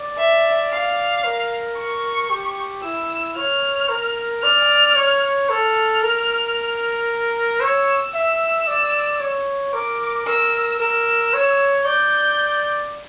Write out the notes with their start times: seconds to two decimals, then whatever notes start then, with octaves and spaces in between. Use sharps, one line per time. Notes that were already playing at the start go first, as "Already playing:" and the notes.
Already playing: D5
0.18 E5
0.70 F5
1.24 A#4
1.77 C#6
2.30 G4
2.83 E4 E6
3.36 C#5 F6
3.89 A#4
4.42 D5 F6
4.95 C#5
5.49 A4 F6
6.03 A#4
7.61 C#5 E6
8.14 E5 E6
8.67 D5
9.20 C#5
9.74 A#4 D6
10.27 A#4 E6
10.80 A#4 E6
11.34 C#5
11.86 D5 G6